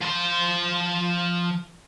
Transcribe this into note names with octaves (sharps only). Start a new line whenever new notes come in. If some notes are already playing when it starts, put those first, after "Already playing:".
F3 C6